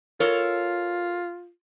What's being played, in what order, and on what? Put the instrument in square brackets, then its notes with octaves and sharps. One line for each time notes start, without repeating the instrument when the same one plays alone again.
[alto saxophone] F4 [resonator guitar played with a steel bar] A4 A#4 C#5